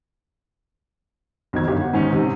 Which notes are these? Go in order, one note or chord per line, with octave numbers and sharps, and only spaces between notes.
B1 F2 D#3 G#6
G1 F#2 G4
F#5
G#2 D#3 C#4 D#4
G#2 C3